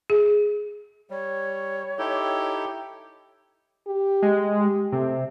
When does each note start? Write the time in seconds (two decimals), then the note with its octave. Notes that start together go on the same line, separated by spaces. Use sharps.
0.10 G#4
1.10 G3 C#5
1.99 D#4 E4 G4 A4
3.87 G4
4.22 G#3
4.59 G4
4.92 C3 A3